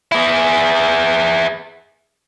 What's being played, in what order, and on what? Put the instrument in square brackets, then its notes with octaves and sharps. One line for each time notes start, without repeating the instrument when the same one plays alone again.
[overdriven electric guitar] E4 G#4